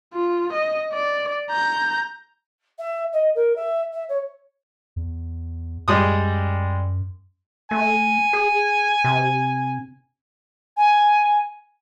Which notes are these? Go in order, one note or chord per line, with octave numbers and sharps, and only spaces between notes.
F4
D#5
D5
A#5 G6
E5
D#5
A#4
E5
E5
C#5
E2
F#2 G3 G#3 D#6
A3 G#5
G#4
C3
G#5